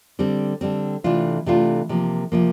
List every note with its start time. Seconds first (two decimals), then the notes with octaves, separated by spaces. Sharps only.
0.19 D3 G3 C4
0.61 D3 G3 C4
1.04 C3 E3 A3 D4 F4
1.46 C3 E3 A3 D4 F4
1.89 C3 F3 A#3
2.32 C3 F3 A#3